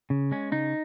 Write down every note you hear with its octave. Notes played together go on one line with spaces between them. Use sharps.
C#3
G#3 C#4
C#3 D#4